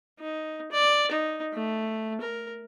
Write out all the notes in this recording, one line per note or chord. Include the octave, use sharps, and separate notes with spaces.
D#4
D5
D#4
A3
A#4